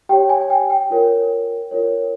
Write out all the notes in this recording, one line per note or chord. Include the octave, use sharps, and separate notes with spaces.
G4 C#5 G5
G#5
G5
G5
F4 A#4 C#5
F4 A#4 C#5